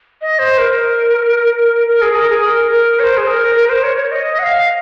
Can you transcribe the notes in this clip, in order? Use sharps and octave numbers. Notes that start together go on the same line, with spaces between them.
D#5
C5
A#4
A#4
G#4
A#4
G#4
A#4
A#4
C#5
C5
G#4
A#4
A#4
C5
C#5
C#5
D#5
F#5
F5